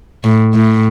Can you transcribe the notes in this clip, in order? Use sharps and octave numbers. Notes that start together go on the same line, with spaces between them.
A2
A2